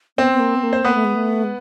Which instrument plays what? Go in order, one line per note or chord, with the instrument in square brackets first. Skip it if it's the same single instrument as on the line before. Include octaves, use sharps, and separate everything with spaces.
[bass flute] B3 [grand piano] C4 C5
[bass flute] B3
A#3
B3
A#3
[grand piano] C5
[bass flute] A#3 [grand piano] B3 B4
[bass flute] A3
G#3
A3
G#3